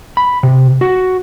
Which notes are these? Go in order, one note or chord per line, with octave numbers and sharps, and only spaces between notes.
B5
C3
F#4